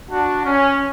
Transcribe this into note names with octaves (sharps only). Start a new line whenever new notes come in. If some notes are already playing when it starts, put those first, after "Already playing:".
D4 F#4
C#4